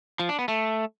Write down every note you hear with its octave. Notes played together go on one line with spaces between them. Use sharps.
F3
D4
B3
A3